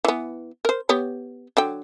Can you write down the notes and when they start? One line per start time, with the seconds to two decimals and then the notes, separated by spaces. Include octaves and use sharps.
0.05 E3 B3
0.65 A#4 C5
0.89 B3 G4 C#5
1.57 D3 F#3 G5